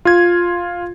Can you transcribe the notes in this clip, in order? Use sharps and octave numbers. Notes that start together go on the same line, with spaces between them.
F4 G#6